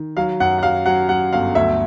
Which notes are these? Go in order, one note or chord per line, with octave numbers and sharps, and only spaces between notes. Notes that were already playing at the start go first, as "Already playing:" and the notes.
Already playing: D#3
F#3 F5
F#2 F#5
F#5
F#3 F5
F#3 F#5
F#3 F#5
G1 F5
D2 E5